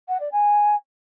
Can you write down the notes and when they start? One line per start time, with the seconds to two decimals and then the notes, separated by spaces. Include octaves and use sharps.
0.09 F#5
0.20 D5
0.32 G#5